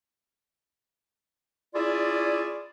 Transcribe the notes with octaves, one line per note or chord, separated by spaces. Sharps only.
C#4 E4 F4 G#4 D5